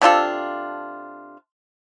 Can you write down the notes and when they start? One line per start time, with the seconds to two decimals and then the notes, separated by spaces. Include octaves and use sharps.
0.02 C3 D4 F4 A4